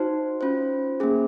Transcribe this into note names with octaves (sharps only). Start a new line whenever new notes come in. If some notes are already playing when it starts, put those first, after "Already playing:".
Already playing: D#4 F#4 C5
C#4 F4 C5
A#3 C#4 G#4